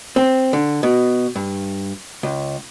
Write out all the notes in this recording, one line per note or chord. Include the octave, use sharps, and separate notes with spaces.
C4
D3
B2
G2
C#2